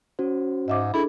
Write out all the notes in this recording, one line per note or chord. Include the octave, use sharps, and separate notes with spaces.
C#4 F#4 C5
G#2 D#5 E5 D6
D4 E4 G#4 A4